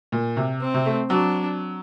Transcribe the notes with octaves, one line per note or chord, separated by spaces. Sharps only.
A#2
C3
C4
C3
A3
F#3 D4